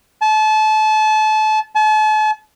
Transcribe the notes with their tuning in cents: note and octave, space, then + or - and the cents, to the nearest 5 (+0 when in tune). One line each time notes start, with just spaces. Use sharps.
A5 -30
A5 -40